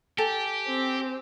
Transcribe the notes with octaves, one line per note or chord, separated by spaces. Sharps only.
G4 A4 G#5
C4